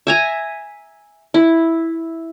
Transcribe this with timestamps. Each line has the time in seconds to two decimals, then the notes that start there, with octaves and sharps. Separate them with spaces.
0.07 E5 G#5 A#5
1.34 E4